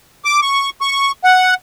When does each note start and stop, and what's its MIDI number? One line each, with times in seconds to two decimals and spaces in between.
0.25 0.40 86
0.42 0.70 85
0.81 1.11 85
1.24 1.54 78